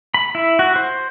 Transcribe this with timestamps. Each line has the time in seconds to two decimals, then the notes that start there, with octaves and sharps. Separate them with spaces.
0.14 B5
0.35 E4
0.59 F#4
0.76 C5